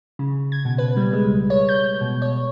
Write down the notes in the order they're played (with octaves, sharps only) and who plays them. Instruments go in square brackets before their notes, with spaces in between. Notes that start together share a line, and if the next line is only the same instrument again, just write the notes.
[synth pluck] C#3
G#6
B2
B4
G3
G#3
C#2
C#5
G6
B2
C#5